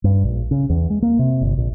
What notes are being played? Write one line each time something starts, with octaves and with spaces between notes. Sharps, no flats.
G2
A#1
C#3
E2
G#3
A#3
C3
G1
A#1